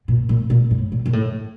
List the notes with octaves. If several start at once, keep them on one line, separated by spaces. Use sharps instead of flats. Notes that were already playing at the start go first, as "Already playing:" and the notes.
A#2
A#2
A#2
A2
A#2
A#2
A2